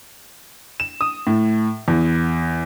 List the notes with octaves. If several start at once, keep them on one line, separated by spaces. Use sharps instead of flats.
E7
D#6
A2
E2